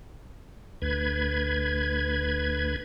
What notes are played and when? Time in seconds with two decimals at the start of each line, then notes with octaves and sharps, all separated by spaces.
0.82 D2 B4 G#6